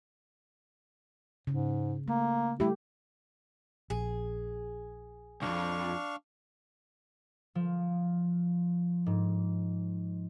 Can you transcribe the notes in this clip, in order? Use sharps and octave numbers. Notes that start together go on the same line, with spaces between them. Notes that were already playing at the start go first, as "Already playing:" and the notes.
G#2 C#3
A3 A#3
G3 A3 E4 G4
A#1 G#4
C2 F2 D4 F5 C#6
F3
G#2